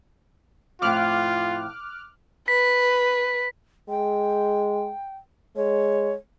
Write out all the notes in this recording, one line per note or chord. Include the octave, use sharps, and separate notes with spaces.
F2 A2 F4 D6 F6 F#6
B4 B6
G#3 G5
G#3 C#5